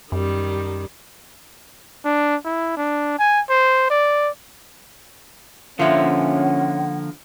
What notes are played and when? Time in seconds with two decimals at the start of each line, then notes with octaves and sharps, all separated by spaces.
0.12 F#2 D#3 G3
2.05 D4
2.45 E4
2.77 D4
3.19 G#5
3.50 C5
3.90 D5
5.79 D3 F3 A#3 C#4 F4 E5 F#5